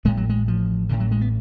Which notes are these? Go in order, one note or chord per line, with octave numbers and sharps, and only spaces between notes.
A1 A2 G#3
F#3
G#3
F3
A1 A2 D3
F#3
G#3
B3